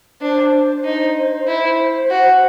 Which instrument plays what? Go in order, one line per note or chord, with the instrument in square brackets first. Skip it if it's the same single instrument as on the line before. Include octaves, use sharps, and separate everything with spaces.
[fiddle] D4 [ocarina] C5
[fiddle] D#4
E4
F#4